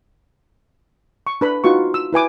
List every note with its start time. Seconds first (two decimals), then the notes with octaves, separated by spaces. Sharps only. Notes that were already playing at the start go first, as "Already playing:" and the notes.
1.27 C#6
1.41 D4 B4 B5
1.64 D#4 F4 F#4 B4 C#6
1.94 E6
2.13 E4 B4 G#5 D6